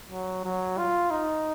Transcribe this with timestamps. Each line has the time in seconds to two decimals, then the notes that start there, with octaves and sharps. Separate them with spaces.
0.10 F#3
0.44 F#3
0.78 F4
1.11 D#4